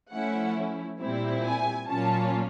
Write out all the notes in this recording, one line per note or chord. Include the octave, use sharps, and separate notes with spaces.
F3 A3 C#4 E4 F#5
A#2 G3 C4 E4
G#5
A#2 F#3 A#3 C#4 F4 A5